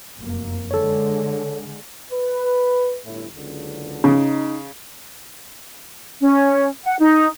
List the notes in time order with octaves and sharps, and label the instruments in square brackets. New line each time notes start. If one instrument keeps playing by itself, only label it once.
[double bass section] F1 F#2 A#3
[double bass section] D3 G#3 [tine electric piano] A4 C#5
[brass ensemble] B4
G1 A2 E4
F#1 C#2 D3
[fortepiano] C#3 [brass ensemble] D#4
[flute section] C#4
F#5
D#4